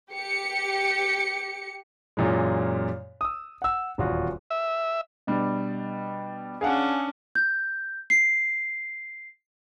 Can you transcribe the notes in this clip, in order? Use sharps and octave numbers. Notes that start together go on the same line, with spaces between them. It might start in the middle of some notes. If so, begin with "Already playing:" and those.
G4 C#7
F#2 A#2 E3 G#3
D#6 E6
F#5 E6
D#1 E2 F4 F#4
E5
B2 G3 D4
C#4 D4 G#4 F5 F#5
G6
C7